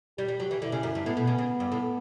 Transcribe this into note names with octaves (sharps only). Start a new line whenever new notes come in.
G3 G4
G3
F#3
E3
D3 E4
C#3
F#2
G2
A2 B3
B2
C#3
C#3
G2
A2